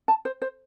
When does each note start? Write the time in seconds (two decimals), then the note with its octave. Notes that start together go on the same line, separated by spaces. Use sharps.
0.08 A5
0.25 C5
0.42 C5